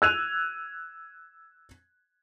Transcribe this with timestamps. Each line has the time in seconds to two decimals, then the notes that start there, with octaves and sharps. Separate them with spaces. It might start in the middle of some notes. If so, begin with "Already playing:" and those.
0.02 E6 F#6 G#6 D#7 F7